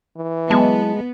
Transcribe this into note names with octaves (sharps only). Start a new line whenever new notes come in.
E3
F#3 G#3 B3 E4 A5